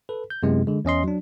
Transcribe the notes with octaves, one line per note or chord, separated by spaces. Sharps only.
A4 B4
G6
F#2 C3 G#3 B3 E4
D3 G#3
E2 C#4 D#5 C6
F#3 D4